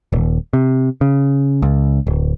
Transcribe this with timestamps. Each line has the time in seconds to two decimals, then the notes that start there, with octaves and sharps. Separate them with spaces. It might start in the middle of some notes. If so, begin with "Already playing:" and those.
0.12 D#1
0.53 C3
1.01 C#3
1.62 C#2
2.07 D1